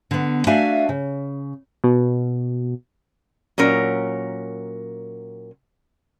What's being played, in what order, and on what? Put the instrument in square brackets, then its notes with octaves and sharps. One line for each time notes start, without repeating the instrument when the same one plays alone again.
[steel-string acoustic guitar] D3 B3
A3 D4 F#4 E5 F5 G#5
C#3
[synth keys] B2
[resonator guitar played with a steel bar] A#2 F#3 C#4 A#4